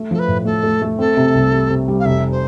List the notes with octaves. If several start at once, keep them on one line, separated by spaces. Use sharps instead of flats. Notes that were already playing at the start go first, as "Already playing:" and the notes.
Already playing: A3
F3 A4
B4
A2
A3 A4
A3
A3
C4 A4
C3
C2
G3
C3
G3
F5
F1 E5
C5